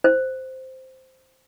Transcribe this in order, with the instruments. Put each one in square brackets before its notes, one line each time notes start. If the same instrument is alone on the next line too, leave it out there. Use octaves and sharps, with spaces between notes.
[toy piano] C5